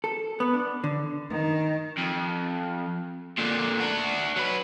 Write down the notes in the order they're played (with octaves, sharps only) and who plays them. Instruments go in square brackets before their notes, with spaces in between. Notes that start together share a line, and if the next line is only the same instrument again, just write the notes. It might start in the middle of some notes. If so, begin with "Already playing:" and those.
[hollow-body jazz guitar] A4
B3
D4
D3
[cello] D#3
[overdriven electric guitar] F2
A#2 D3
D4 F#4
F#3 B4